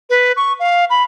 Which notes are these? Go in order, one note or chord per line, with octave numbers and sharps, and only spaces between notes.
B4
C#6
F5
B5